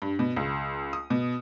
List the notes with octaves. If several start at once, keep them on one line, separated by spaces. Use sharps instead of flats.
G2
B2
C#2
D#6
B2